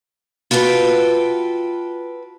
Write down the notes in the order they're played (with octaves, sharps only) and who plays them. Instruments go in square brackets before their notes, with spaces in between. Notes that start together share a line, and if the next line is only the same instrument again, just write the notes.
[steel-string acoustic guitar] F4 F#4 A4 B4 G5